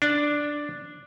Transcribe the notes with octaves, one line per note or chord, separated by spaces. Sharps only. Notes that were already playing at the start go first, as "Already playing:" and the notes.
D4